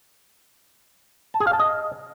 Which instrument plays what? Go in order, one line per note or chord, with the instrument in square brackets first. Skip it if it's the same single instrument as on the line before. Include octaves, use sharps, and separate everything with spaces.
[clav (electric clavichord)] A5
G#4
F5
A5
D#5